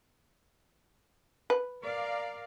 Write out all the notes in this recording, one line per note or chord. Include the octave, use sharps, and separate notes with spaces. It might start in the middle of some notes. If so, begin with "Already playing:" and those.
B4
A#4 D5 F5